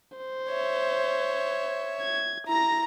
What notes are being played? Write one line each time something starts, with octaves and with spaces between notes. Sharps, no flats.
C5
C#5 E5
G#6
E4 A#5 A#6